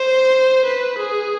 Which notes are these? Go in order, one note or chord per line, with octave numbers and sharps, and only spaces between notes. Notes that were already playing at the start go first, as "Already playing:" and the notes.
Already playing: C5
B4
G#4